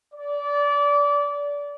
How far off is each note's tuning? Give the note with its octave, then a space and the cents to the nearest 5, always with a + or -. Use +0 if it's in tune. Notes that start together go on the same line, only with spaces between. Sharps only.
D5 -25